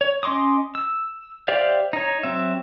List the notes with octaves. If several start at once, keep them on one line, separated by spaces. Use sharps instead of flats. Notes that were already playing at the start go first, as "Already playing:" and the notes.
C#5
C#4 D#5 C6 D6 D#6
E6
G4 C5 D5 E5 F5
D#4 C#5
F#3 C4 E5